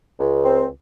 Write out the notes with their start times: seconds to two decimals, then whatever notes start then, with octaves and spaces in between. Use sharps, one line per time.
0.19 C#2
0.44 C4